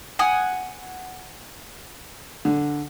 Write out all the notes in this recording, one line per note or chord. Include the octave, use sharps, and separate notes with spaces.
F#5 G#5 D#6
D3